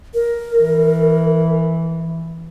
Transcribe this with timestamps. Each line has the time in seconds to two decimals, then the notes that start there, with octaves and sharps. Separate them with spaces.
0.14 A#4
0.59 E3